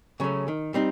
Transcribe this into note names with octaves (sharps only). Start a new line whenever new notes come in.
C#3 F#3 A3 C#4
D#3
G3 C4 D#4